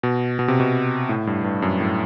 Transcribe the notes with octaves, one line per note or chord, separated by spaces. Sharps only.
B2
B2
C3
B2
A2
G2
G2
F#2
A2